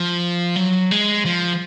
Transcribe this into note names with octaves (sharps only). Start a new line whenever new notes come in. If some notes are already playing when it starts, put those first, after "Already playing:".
Already playing: F3
F#3
G#3
F3